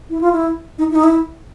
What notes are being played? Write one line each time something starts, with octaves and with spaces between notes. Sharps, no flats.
E4
F4
E4
D#4
E4
D#4
E4